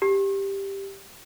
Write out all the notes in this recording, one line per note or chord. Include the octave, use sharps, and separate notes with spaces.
G4